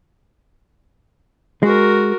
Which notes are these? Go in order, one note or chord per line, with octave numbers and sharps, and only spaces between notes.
G#3 F#4 A#4